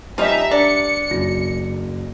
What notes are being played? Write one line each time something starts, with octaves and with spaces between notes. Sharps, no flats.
F3 G3 C#4 D#4 E5 A#5
D4 C#7
F#1 F#2 A#6